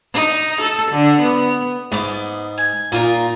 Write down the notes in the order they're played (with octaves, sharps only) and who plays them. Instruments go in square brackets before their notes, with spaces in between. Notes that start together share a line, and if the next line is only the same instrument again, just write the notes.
[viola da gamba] D#4
A4
D3
B3
[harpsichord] G#2 [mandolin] B3 D6
[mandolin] G#5
[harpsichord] A#2 [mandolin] D#4 F4 A#4